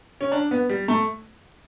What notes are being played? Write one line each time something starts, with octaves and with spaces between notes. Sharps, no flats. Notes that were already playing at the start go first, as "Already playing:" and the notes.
C#4
D4
B3
G3
A3